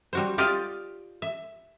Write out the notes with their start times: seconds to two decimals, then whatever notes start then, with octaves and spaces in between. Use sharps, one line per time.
0.13 G3 F#4 C5
0.38 F4 G4 D5 D#5 F5
1.22 E5